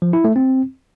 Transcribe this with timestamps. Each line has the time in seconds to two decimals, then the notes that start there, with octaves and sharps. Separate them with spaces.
0.02 F3
0.13 E4
0.25 A3
0.36 C4